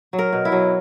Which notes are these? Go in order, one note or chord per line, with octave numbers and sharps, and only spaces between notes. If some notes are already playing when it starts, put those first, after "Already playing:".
F#3
A#4
B2
E4
F#3